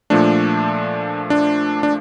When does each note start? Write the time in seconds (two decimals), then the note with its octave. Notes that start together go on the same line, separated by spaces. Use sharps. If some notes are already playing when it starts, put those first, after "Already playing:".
0.10 A#2 F3 A3 D4
1.30 D4
1.83 D4